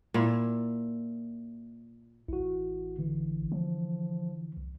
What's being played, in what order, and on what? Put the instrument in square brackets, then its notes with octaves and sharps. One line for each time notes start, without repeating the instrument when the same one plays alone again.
[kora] A#2 E4
[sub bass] A1 [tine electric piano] E4 F#4
[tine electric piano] D3 E3
[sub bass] F3
[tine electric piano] C2